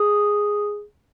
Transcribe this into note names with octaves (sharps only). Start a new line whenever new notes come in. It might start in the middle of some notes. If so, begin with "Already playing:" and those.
Already playing: G#4